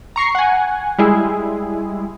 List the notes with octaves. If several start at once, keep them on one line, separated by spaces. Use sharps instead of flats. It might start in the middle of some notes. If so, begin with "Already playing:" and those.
A#5 C#6 C7
F#5 G#5
G3 G#3 E4 G#4